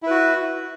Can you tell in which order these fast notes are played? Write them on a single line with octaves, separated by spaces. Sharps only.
E4 B4 F#4